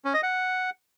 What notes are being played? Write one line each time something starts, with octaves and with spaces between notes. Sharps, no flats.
C#4
D#5
F#5